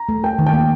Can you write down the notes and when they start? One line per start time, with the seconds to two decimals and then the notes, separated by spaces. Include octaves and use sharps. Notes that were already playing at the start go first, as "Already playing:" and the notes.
Already playing: A#5
0.09 A3
0.24 A#4 G5
0.39 D#3
0.46 G5
0.54 A#3